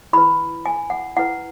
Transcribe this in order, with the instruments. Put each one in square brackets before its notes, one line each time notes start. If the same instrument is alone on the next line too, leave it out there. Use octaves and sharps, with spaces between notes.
[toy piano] E4 B4 B5
G#5
F#5
E4 B4 F#5